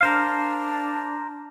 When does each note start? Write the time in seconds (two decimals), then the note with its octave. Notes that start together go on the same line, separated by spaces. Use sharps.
0.01 D4 A#4 C5 F5